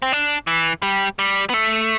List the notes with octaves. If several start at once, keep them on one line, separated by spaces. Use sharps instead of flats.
C4
D4
E3
G3
G3
B3
A3